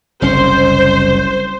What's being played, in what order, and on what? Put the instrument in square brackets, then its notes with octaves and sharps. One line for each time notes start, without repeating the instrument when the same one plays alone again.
[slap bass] F#1 C2 C#4 [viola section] C5